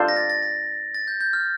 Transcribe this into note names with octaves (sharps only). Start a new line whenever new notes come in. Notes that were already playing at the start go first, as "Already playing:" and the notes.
Already playing: D4 F4 A4 C5 F5
A#6
A6
A6
A#6
A6
G6
G6
F6